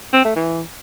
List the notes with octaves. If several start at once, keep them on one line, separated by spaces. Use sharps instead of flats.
C4
A3
E3